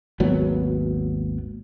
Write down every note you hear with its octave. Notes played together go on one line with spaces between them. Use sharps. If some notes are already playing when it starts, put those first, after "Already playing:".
G#1 D#2 F#3 B3